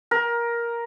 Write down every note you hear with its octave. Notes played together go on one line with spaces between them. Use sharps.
A#4